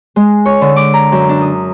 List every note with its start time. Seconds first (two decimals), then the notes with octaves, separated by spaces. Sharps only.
0.16 G#3
0.45 C#5
0.61 D3
0.76 D6
0.94 A#5
1.12 F#2
1.29 D4
1.42 D#6